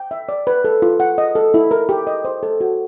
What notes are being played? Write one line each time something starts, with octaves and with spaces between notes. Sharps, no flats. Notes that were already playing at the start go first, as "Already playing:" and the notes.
Already playing: G5
E5
D5
B4
A4
F4
F#5
D#5
A4
E4
A#4
G4
D#5
C5
A4
F#4